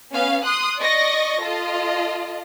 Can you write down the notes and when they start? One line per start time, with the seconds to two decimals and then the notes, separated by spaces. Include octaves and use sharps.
0.13 B3 C#4 F5
0.45 C6 D#6 F#6
0.79 D5 D#5 C#6 A#6
1.42 F4 A4 D#5